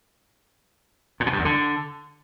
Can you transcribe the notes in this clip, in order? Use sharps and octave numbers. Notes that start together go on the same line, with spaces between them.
A#2
B2
G2
E2
D3